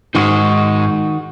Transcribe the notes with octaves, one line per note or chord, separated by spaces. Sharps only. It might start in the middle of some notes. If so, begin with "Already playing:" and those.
G#2 D#3 G#3 D#4 F#4